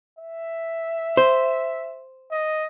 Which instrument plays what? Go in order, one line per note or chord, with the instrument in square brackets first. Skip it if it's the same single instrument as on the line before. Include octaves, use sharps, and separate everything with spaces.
[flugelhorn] E5
[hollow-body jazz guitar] C5
[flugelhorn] D#5